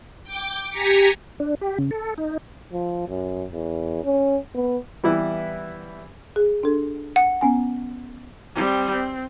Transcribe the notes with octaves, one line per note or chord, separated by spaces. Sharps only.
G5 D6
G4 G#5 A#5 B6 C#7
D4
G4
C#3
A4
D#4
F3
F#2
E2
C#4
B3
E3 G3 B3 E4 B4
G#4
D4 A4
F#5
B3 C#4 G#5
G3 C4
C4